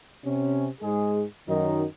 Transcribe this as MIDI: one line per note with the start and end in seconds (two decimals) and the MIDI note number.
0.25 0.68 48
0.25 0.68 61
0.82 1.24 44
0.82 1.24 56
0.82 1.24 68
1.48 1.85 42
1.48 1.85 51
1.48 1.85 54
1.48 1.85 63